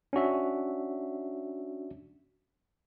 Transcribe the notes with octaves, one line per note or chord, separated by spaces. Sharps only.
C#4 D4 F#4 E5